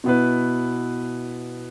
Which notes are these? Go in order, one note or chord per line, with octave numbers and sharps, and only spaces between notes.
B2 B3 E4 B4